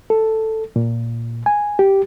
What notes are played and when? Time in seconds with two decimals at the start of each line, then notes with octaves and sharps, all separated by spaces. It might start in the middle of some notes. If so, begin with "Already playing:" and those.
0.10 A4
0.76 A#2
1.46 G#5
1.79 G4